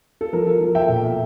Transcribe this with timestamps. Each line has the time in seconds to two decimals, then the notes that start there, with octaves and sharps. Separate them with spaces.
0.21 A4
0.33 F3 A#4
0.47 A4
0.61 F3
0.75 E5 G5
0.89 A#2